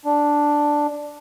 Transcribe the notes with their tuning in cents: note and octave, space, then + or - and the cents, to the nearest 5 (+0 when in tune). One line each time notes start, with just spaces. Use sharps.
D4 +0